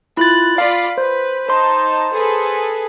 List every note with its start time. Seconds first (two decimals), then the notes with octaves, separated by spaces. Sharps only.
0.17 E4 F4 F#6 A6
0.58 F4 D5 F5 B5
0.98 B4 C5
1.49 D#4 C5 A5 C6
2.12 G#4 A4 B4